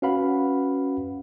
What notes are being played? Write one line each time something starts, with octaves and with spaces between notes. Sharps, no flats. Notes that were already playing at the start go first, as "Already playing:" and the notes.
C#4 F#4 B4 F5 F#5 B5